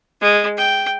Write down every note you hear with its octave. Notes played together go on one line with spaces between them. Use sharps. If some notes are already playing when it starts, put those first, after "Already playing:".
G#3
G5